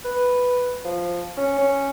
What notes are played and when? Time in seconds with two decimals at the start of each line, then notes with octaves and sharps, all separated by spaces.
0.04 B4
0.85 F3
1.37 C#4
1.58 C#4